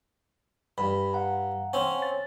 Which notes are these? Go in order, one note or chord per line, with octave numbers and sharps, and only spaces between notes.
G2 B5
F5 F#5 A#5
C4 C#4
A6